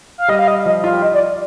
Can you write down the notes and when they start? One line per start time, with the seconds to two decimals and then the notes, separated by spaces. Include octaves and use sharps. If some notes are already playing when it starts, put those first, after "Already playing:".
0.18 F5
0.28 G3 D#5
0.39 F5
0.48 D#5
0.66 F3 D#5
0.84 F4 F5
0.93 G4
1.02 F4 D#5
1.14 D5